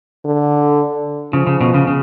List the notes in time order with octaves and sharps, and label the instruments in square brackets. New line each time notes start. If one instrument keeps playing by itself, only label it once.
[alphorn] D3
[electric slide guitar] C#3 [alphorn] F3
[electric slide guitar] C#3
B2
C#3
C#3